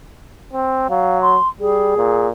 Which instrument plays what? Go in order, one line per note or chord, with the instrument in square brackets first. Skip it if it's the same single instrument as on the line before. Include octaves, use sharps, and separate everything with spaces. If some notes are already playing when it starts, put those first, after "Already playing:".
[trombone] C4
[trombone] F#3 [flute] F5
[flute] C6
[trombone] G3 [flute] G#4
[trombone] A#2